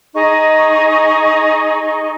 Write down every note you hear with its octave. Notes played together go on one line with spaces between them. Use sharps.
D#4 G#4 D#5 C#6